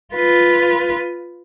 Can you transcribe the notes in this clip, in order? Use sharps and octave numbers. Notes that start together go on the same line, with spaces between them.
F4 B4